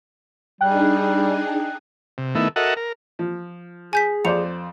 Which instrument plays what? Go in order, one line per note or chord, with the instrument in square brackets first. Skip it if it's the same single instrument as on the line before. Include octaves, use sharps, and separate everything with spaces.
[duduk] G3 [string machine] D4 D#4 G#4 [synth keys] G5 F#6
[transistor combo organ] C3
D#3 A3 B3 E4
F#4 A4 A#4 D#5 E5 F#5
A#4
[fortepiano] F3
[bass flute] G#4 [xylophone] G#5 G6 B6
[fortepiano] F2 C5 D5 [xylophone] C#7 F7